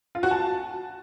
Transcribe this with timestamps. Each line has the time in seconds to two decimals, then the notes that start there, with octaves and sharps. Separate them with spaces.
0.15 F4
0.23 F#4
0.31 A5